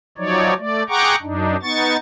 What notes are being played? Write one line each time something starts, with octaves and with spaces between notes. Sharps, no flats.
F3 F#3 D#4 C#5 D5
A3 D5
G#4 F#5 G5 A#5 C#6 D6
F#2 D4 D#4
B3 D#4 C#6 A6